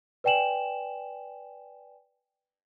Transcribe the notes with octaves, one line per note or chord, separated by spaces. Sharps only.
B4 D5 G5 G#5 E7 F#7